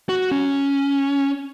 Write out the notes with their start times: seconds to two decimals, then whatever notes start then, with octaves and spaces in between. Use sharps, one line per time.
0.09 F#4
0.31 C#4